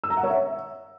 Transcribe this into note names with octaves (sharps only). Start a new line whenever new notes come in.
E6
A#5
F#5
C#5
E5